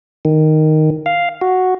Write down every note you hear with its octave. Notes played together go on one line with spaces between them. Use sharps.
D#3
F5
F#4